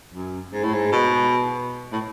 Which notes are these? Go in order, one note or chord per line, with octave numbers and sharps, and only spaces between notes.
F#2
G#2
A2
G#2
B2
A2